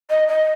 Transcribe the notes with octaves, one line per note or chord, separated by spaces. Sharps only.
D#5
D#5